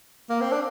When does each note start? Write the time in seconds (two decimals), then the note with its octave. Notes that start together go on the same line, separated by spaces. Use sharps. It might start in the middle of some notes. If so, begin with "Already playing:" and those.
0.30 A#3
0.41 C4
0.52 D4